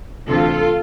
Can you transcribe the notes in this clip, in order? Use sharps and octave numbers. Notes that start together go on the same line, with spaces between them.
D2 C3 E3 F4 A4